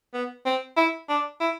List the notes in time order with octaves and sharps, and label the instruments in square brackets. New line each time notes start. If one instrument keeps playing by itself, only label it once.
[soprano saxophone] B3
C4
E4
D4
E4